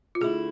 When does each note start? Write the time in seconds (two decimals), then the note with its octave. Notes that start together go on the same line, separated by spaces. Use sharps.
0.15 F4
0.21 D3 A3 E4 G#4